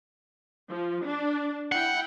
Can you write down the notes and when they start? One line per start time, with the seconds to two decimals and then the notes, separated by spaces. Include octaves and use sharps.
0.70 F3
1.04 D4
1.72 E4 F#5 G5